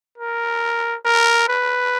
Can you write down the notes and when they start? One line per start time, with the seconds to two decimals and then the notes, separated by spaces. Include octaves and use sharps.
0.18 A#4
1.05 A#4
1.49 B4